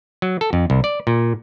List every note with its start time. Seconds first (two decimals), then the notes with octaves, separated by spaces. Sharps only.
0.22 F#3
0.41 A4
0.53 F2
0.70 C2
0.84 D5
1.07 A#2